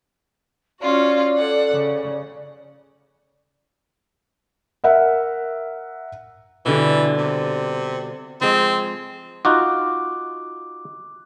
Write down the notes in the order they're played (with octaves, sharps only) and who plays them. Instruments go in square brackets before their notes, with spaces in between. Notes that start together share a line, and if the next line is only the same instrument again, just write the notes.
[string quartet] C#4 F4 F#4 [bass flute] D5
[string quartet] A4 F#5
C#3
[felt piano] A#4 E5 F#5
[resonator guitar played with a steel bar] B2 D3 G3 [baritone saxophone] E3
[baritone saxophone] C3
[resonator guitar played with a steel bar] F3 G#3 [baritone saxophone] C4
[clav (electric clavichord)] D#4 F4 F#4 [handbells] D6 F#6